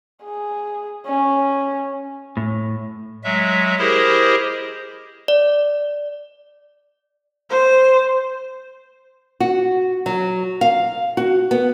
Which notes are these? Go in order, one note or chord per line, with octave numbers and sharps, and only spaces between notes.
G#4
C#4
A2
F#3 G#3 E5
E4 G4 G#4 A#4 C5 D#5
D5
C5
F#4
F#3
F5
F#4
B3